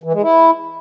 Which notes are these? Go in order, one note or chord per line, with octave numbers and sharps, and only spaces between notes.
E3
G#3
E4